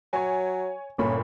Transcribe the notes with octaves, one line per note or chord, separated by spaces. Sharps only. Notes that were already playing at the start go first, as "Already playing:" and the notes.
F#3 C#5 G#5
G1 A#2 C#4 B5